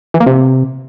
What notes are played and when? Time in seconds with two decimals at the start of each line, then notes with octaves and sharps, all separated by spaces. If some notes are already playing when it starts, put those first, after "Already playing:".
0.14 E3
0.20 A#3
0.27 C3